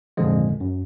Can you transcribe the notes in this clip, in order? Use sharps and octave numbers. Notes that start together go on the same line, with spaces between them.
G#1 F2 A#2 D3 F3 G#3
F#2